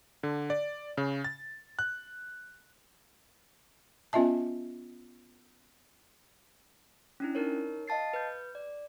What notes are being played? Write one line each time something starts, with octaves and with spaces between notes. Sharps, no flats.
D3
D5
C#3
A6
F#6
B3 C#4 F4 D#5 E5 A5
C#4 D4 E4
D#4 A#4 C#5
D#5 F5 A5 A6 C7
B4 G6
D5